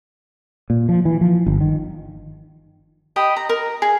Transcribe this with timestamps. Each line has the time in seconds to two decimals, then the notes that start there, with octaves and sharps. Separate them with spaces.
0.70 A#2
0.89 F3
1.05 E3
1.21 F3
1.46 G1
1.61 D#3
3.16 G4 D#5 B5
3.36 A#5
3.49 A#4
3.82 G#4